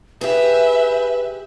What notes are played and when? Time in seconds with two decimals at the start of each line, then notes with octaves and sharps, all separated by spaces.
0.21 G4 G#4 B4 E5